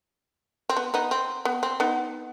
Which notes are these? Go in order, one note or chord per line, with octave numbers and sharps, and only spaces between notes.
C4
B3
B3 D#4
C4
B3
C4
B3 D#4